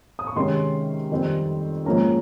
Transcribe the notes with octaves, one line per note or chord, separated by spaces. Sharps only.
D#6
C#6
C3 D#3 G#3 C#4 C6
F2 D#3 G3 C4
G#2 F3 A#3 C#4 A#5